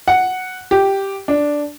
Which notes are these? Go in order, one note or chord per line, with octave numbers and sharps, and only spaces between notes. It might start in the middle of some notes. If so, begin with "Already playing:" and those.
F#5
G4
D4